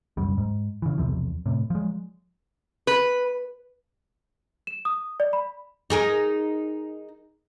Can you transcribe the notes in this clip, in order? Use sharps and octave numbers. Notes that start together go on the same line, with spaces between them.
E1 C#2 F#2 G3
G#2
C#3 E3
B1 E2 C3 F3
A2 C3
F3 G#3
B4
E7
D#6
D5
B5
D#4 G#4 A#4